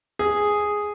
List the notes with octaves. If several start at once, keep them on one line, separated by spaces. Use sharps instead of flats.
G#4